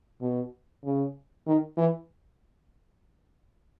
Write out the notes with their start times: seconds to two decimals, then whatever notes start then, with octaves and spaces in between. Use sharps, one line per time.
0.21 B2
0.84 C#3
1.47 D#3
1.77 E3